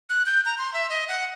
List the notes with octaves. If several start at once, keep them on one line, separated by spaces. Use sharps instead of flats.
F#6
G6
A#5
C6
E5
D#5
F#5